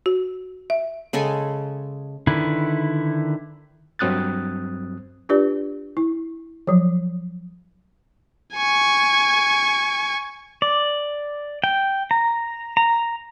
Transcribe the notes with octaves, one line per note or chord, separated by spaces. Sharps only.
F#4
E5
C#3 G#3 A4 G#5
D3 D#3 E4 B4
G2 F#3 C4 D#6 F#6 A6
D4 F4 G4 B4 D5
E4
F3 F#3
G#5 C#6
D5
G5
A#5
A#5